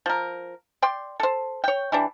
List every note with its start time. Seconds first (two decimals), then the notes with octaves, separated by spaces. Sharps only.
0.06 F3 A#4
0.82 D5 G5 C6
1.20 A4 C5
1.64 C#5 G5
1.92 E3 G3 D4